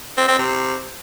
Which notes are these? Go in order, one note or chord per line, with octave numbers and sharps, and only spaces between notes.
C4
C4
C3